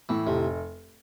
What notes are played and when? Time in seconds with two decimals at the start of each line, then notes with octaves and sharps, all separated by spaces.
0.09 A2 E3
0.26 F1 C3